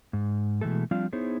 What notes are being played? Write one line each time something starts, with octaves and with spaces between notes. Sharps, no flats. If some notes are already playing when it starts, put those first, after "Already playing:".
G#2
B2 E3 G#3 A3 A4
F3 G3 C4 D4 F4 F5
B3 D#4 E4 G#4 C5 C#5